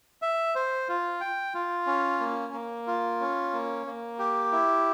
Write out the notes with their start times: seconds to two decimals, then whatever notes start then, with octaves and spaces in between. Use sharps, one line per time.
0.22 E5
0.55 C5
0.89 F4
1.21 G5
1.54 F4
1.87 C#4
2.20 A#3
2.53 A#3
2.87 F4
3.20 C#4
3.53 A#3
3.87 A#3
4.19 G4
4.52 E4